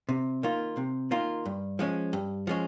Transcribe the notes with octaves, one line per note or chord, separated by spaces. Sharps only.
C3
D#3 A#3 F4
C3
D#3 A#3 F4
G2
F3 G#3 C#4
G2
F3 G#3 C#4